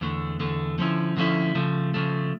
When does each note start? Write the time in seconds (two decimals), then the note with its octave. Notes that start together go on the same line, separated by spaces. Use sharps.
0.01 E2 D3 A3
0.40 E2 D3 A3
0.78 D3 F3 A3 C#4 E4
1.17 D3 F3 A3 C#4 E4
1.55 C#3 F3 A3
1.94 C#3 F3 A3